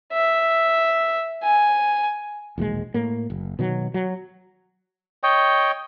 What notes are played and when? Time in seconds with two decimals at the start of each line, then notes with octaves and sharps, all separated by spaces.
0.13 E5
1.43 G#5
2.58 E1 A#1 D#2 G#3
2.94 A2 A#3
3.30 F#1
3.59 B2 D#3 F#3
3.94 F#3
5.23 C#5 D#5 G5